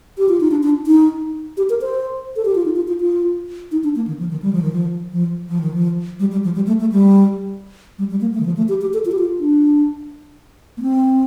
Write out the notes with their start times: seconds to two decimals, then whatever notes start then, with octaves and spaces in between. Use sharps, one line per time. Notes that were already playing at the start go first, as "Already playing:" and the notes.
0.18 G4
0.29 F4
0.41 D#4
0.51 D4
0.63 D4
0.87 D#4
1.57 G4
1.70 A#4
1.81 C5
2.36 A4
2.45 G4
2.55 F4
2.65 D#4
2.76 F4
2.88 F4
3.01 F4
3.72 D#4
3.84 D4
3.96 A#3
4.07 D#3
4.19 F3
4.31 D#3
4.42 G3
4.53 F3
4.62 D#3
4.73 F3
5.13 F3
5.49 F3
5.61 D#3
5.74 F3
6.20 G3
6.32 G3
6.44 F3
6.55 G3
6.67 A3
6.80 A3
6.92 G3
7.99 G3
8.10 G3
8.21 A#3
8.34 A3
8.40 D#3
8.46 F3
8.57 A3
8.69 G4
8.81 G4
8.94 A4
9.05 F4
9.12 G4
9.19 F4
9.40 D4
10.77 A#3
10.82 C4